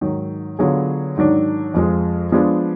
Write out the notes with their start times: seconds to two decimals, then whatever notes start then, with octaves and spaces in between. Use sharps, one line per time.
0.01 G#2 D#3 F#3
0.59 D3 F#3 B3 F4 G#4
1.17 G#2 D#3 F#3 D4
1.74 F2 F3 G#3
2.32 F3 G#3 B3 D4 G#4